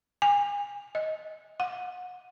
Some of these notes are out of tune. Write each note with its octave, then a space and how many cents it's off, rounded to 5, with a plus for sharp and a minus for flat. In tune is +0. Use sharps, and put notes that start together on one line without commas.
G#5 -30
D#5 +15
F#5 -30